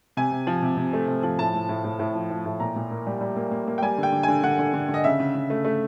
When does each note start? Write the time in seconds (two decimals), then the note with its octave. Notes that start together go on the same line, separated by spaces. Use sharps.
0.17 C3 G#5
0.31 C3
0.47 F3
0.62 C3
0.77 C3
0.93 A3
1.08 C3
1.23 F3
1.39 A2 A5
1.54 A2
1.69 A2
1.84 A2
1.99 A2
2.15 F3
2.30 F3
2.45 A2
2.60 A#2 A#5
2.76 A#2
2.91 A#3
3.07 G3
3.21 G3
3.36 A#3
3.52 A#3
3.67 A#3
3.78 G5
3.82 G3 G#5
3.98 D3
4.03 G5
4.12 D3
4.23 D3 G#5
4.43 D3 F#5
4.59 D3
4.74 D3
4.89 D3
4.94 D#5
5.04 C#3 E5
5.20 C#3
5.35 C#3
5.50 A3
5.65 A3